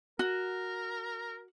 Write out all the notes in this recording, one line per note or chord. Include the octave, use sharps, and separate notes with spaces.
F#4 A#4